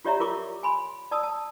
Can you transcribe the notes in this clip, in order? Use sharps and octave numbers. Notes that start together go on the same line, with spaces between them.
F4 G4 C#5 D5 E5 A#5
F4 A#4 C#6 D6
G#5 B5 C6
D5 A5 D#6 E6
A5